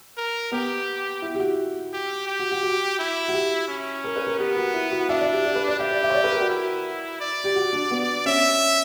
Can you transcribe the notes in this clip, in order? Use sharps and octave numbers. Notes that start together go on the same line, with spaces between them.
A#4
B3 G4
E4
G4
F#4
G4
G4
F#4
F#4
F#4
E4
F#4
G4
C#4
A#4
B4
A#4
B3 G4
F#4
E4
F#4
D4 E5
D5
G4
G4
B4
D5
G4 E5
D5
E5
C#5
D5
B4
A#4
F#4
E4
D5
G4
F#4
D4
B3
C#4 E5